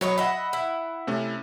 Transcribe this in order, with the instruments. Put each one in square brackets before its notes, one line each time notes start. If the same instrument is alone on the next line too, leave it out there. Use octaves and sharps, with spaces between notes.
[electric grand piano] F#3 [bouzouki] B4 C#5 D#5
[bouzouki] D#5 E5 [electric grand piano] F#5 B5
[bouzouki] E4
[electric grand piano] C3 A3 C#4